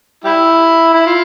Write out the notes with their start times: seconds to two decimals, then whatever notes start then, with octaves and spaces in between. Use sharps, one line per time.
0.24 G3 E4
0.94 E4
1.06 F4